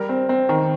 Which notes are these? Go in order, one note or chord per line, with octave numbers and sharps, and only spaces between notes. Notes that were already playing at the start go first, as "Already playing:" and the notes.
Already playing: G3 A#4
C4
C4
D#3